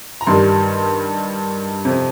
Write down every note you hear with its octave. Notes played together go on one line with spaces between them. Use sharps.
A#5
G2 D#3 G3 C6
F2 C3